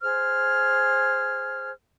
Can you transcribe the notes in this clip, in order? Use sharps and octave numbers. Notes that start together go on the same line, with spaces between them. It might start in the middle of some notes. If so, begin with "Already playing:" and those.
G#4 C5 F6